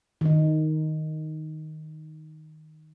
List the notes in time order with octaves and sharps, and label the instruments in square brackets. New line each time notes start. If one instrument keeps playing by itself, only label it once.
[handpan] D#3 D#4